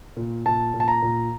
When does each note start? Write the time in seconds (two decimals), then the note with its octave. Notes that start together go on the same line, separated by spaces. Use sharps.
0.17 A#2
0.46 A#2 A5
0.74 A#2
0.80 A5
0.88 A#5
1.02 A#2